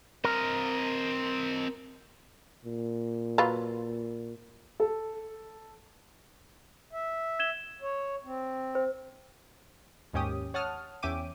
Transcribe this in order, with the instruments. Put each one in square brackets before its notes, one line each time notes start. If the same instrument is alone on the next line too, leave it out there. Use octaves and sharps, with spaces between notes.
[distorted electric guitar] C4 D#5 [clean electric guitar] A#4
[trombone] A#2
[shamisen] F#3 F4 B4
[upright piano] A4
[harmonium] E5
[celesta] G#6 E7 G7
[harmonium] C#5
C4
[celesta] C5
[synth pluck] D#2 G#2 C#4 G4 D#6
C#5 F#5 A5 D#6 F6
E2 C#4 E5 G5 D6 D#7